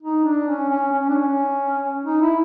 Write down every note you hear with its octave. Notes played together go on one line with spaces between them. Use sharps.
D#4
D4
C#4
C#4
C#4
D4
C#4
D#4
E4